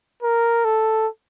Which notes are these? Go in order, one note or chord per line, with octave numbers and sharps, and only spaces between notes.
A#4
A4